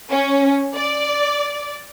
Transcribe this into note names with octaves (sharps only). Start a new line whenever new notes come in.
C#4
D5